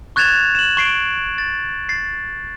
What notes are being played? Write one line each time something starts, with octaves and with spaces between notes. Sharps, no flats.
C#6 F#6 G#6 A6 E7 F7
E7 F#7
C#6 C7 D7
A6
A6 C7